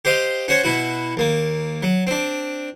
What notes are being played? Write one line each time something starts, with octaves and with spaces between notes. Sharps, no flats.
G4 C5 D#5 F5
C#4 F#4 C5 C#5
B2 E4 F#4
D#2 A#3
F#3
C4 D4